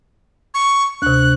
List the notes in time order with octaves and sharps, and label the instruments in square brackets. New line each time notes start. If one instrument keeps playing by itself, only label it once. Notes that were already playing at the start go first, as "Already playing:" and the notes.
[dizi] C#6
[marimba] D2 C3 [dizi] F#6